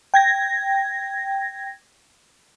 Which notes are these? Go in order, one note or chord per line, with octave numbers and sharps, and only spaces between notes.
G5 G#6 A#6